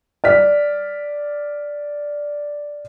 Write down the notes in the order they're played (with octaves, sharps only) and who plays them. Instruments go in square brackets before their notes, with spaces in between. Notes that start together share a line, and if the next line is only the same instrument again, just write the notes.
[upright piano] D5 F6 B6